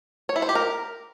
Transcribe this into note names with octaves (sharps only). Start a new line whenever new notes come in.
C#5
E4
C5
G4
A#4